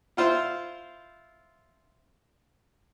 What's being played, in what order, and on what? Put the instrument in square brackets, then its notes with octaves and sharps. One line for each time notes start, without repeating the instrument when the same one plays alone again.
[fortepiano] E4 F4 C5